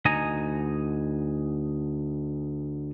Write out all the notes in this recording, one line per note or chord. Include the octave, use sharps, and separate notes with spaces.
D2 D#4 D#5 G#5 A#5